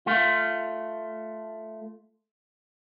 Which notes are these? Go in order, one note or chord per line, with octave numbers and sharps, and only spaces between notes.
A3 F4